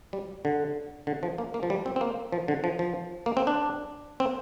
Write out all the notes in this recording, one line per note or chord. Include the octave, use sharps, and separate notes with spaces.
G3
D3
D3
F3
A#3
A#3
F3
G3
C4
C4
A#3
F3
D3
F3
F3
A#3
C4
D4
C4